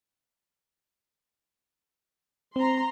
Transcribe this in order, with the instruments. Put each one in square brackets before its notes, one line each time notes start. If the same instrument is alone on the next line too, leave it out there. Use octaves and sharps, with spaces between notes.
[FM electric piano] C4 [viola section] A#5 C6